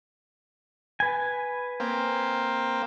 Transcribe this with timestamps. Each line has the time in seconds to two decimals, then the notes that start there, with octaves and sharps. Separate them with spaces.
1.00 B4 G#5
1.80 A#3 C4